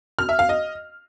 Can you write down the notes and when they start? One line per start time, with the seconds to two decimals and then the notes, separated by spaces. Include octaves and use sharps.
0.19 F6
0.29 E5
0.39 F5
0.49 D#5